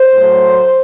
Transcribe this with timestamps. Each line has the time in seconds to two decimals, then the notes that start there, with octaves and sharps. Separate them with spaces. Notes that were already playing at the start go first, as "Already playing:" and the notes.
Already playing: C5
0.14 A2 F#3 A3